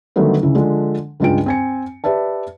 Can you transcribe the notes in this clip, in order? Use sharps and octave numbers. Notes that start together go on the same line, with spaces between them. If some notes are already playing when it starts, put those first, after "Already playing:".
D3 D#3 F#3 G3 A3 B3
C#2 C#3 E4
D3 F3 G#3 D4
C#2 G2 G#3 F4 G5 D7
C4 G#5 C#7
G4 B4 D5 E5 A5